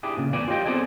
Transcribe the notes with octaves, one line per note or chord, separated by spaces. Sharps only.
D4 E4 G4 G#4
A#2 C#3
E2 A2 B3 D5 G#5
F4 G4 C#5 D#5 G5
B3 C4 G#4 A4 D5 G#5